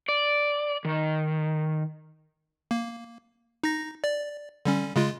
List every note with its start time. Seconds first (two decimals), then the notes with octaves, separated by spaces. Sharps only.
0.09 D5
0.85 D#3
2.71 A#3
3.63 D#4 A#6
4.04 D5
4.65 D3 G3 C#4
4.96 C#3 G#3 F4